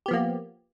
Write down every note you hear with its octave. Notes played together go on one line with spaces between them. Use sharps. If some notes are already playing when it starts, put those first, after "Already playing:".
F3 A#3 B3 G4